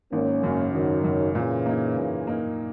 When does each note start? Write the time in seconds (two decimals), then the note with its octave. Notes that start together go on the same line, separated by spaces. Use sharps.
0.12 G#1 A#3 C#4
0.43 F#2 C#3
0.73 G#1 D#3 F#3
1.04 F#2 C#3
1.35 A#2 C#3 E3
1.66 A#3 D#4
1.97 A#2
2.27 A#3 D#4